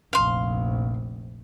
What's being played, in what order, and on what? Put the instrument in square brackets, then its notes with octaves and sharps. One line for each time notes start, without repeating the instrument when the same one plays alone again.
[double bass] F1 A#1 [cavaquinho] F5 C6